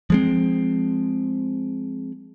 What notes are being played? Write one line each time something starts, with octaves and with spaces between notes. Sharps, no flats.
F3 G#3 C4